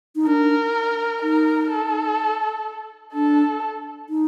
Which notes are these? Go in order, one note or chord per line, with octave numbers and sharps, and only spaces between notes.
D#4
D4 A#4
D#4 A#4
A4
D4 A4
D#4